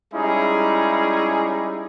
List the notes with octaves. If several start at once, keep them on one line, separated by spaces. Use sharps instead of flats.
G3 G#3 C#4 D#4 E4 G#4